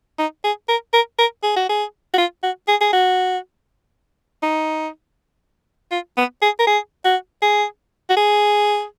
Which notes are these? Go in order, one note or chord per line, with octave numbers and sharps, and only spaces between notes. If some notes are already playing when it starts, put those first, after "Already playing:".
D#4
G#4
A#4
A#4
A#4
G#4
F#4
G#4
F#4
F4
F#4
G#4
G#4
F#4
D#4
F4
B3
G#4
A#4
G#4
F#4
G#4
F#4
G#4